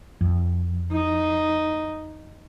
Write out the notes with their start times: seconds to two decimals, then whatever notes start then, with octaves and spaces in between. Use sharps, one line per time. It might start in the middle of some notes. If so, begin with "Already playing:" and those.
0.21 F2
0.92 D#4